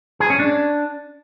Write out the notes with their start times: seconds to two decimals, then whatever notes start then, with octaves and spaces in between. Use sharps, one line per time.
0.20 G#4
0.30 C#4
0.40 D4